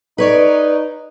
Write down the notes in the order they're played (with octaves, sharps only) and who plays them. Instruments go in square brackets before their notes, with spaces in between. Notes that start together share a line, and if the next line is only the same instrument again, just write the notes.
[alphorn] D#4 [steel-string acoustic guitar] B4 C#5 D5